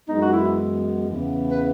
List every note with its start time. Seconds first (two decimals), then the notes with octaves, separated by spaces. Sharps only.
0.08 F#2 E3 G#3 B3 D#4
0.22 F#4
0.33 E4
1.09 E2 C#3 E3 B3
1.51 B4